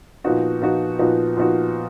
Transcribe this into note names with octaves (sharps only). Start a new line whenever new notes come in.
A#2 F3 B3 D#4 F#4
A#2 F3 B3 D#4 F#4
A#2 F3 B3 D#4 F#4
A#2 F3 B3 D#4 F#4